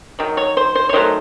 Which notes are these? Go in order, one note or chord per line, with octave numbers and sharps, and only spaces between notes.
D#3 F#3
C#5
C5
C5
C#5
D#3 F#3 A3 C5